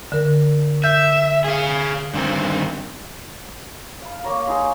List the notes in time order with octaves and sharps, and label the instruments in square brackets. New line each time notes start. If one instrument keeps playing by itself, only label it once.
[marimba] D3 A#4
[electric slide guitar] E5 [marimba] G6
[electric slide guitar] G#4 F5
G2 D#3 C4
[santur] F5 B5
A#3 C#5 A#5
G#3 D#4 G#4